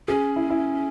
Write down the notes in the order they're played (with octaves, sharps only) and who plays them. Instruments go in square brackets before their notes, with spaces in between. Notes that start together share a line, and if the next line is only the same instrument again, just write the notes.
[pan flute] C#4 [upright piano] G#4
[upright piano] E4
E4